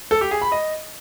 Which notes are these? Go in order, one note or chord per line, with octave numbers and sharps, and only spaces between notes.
A4
G4
G#4
B5
D#5